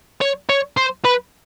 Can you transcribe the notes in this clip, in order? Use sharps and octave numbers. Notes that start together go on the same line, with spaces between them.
C#5
C#5
C5
B4